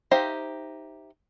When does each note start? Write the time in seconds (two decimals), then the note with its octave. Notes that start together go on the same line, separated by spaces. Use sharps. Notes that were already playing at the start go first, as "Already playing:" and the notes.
0.11 D#4 G4 C5 E5 F5